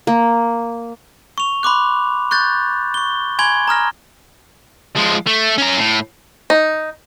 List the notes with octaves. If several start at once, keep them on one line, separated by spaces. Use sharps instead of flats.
A#3
C#6 F7
B5 C6 D6 F#6
C#6 F#6 G6 A6
C#6 G7
G#5 B5 C6 G#6 G7
A#5 D#6 F6 A#6
F3 G#3
A3
C#4 A#5
A2
D#4